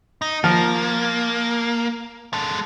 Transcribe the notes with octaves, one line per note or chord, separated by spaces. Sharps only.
D#4
F3 A#3
G#3 A4